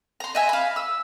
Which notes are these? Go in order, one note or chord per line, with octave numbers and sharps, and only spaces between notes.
A#5 C6
D#5 E5 G#5
F5 B5
E6